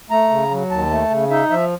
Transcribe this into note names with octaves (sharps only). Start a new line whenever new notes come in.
A3 A#5
C#3
F#3
D#2 A5
A3
C#3
D#4 E5
F3 E5